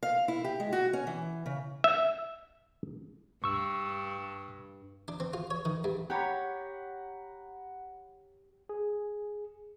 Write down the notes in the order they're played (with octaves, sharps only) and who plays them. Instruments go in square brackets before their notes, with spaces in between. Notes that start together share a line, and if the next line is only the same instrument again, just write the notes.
[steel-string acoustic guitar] F5
E4
G4
G#3
F#4
C#4
E3
C#3
[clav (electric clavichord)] E5
[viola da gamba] G2 [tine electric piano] C#6 E6
[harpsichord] D4
C4
F4
C#5
D#3
G2
[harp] G4 C#5 [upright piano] F#5 A#5 B5
[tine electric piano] G#4